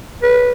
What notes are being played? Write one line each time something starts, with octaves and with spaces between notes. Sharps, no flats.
B4